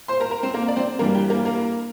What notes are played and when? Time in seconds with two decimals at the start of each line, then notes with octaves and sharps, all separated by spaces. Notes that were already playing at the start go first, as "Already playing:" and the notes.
0.08 C5 C6
0.20 A#4 A#5
0.31 A#4 A#5
0.43 C4 C5
0.54 A#3 A#4
0.68 D5
0.76 C4 C5
0.99 G2 E3 G3 A#3 A#4
1.15 G4
1.30 A#3 A#4
1.45 A#3 A#4